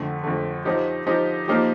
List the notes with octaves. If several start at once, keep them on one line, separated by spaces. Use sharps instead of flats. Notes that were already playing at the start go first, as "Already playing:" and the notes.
Already playing: F2 D3 A3
F2 D3 A3
F3 C4 D#4 G4
F3 C4 D#4 G4
F3 A#3 D#4 G4